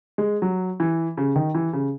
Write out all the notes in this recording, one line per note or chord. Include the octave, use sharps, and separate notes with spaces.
G#3
F#3
E3
C#3
D#3
E3
C#3